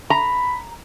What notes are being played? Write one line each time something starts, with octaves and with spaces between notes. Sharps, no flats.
A#5 B5